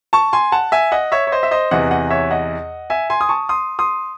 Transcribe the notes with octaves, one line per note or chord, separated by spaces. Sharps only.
A5 C#6
G#5 C6
F#5 A5
E5 G#5
D#5 F#5
C#5 E5
C#5
C5 D#5
E5
C5 D#5
E2 C3 E3 D#5 F#5
D#5 F#5
C#5 E5
D#5 F#5
E5 G#5
G#5 C6
D#6
A5 C#6
C6 D#6
C6 D#6